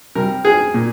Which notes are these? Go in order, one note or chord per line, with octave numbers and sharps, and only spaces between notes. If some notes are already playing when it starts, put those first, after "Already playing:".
C3 G3 A#4
G#4
A#2